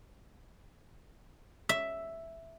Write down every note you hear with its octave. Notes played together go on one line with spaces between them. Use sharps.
E5